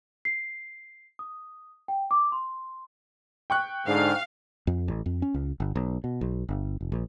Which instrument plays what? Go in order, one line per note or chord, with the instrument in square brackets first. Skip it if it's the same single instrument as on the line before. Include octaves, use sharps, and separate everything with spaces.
[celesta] C7
D#6
G5
D6
C6
[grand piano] G5 C#6 F#6
[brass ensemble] G#2 D3 [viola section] F5
[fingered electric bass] F2
A1
F2
C#4
C#2
G1
B1
B2
B1
G1
F1
A#1